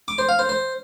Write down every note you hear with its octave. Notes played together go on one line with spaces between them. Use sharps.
D6
C5
F5
C5
C5